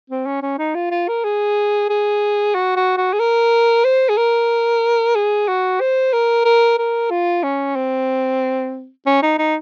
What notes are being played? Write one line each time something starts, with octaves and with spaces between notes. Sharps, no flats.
C4
C#4
C#4
D#4
F4
F4
A#4
G#4
G#4
F#4
F#4
F#4
G#4
A#4
C5
G#4
A#4
G#4
F#4
C5
A#4
A#4
A#4
F4
C#4
C4
C#4
D#4
D#4